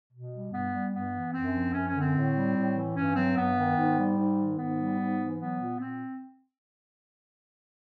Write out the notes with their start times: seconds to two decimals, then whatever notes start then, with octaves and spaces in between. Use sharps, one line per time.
0.12 B2
0.32 G3
0.52 G2 B3
0.73 G3
0.92 G2 B3
1.13 E3
1.34 F#2 C4
1.54 F3
1.74 F#2 C#4
1.87 C#4
1.94 D3
2.01 C4
2.15 A2
2.35 G3
2.55 A2
2.76 E3
2.96 G2 C#4
3.16 F#3 C4
3.36 G2 B3
3.57 D#3
3.77 G#2
3.98 G3
4.17 G#2
4.38 D#3
4.57 G#2 B3
4.78 G3
4.99 G#2
5.19 E3
5.39 F#3 B3
5.59 A#2
5.79 A#2 C4